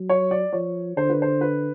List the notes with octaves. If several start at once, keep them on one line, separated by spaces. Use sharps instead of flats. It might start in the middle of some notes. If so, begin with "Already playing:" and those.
Already playing: F#3
C#5
D5
F3 C#5
D3 C5
B4
C5
B4